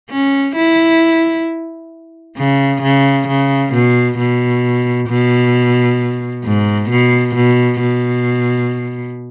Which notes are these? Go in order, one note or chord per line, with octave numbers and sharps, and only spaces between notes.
C#4
E4
C#3
C#3
C#3
B2
B2
B2
G#2
B2
B2
B2